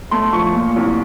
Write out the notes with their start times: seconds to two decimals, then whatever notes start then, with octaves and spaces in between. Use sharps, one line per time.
0.11 A3 C6
0.33 F3 C#6
0.54 A#2
0.76 C2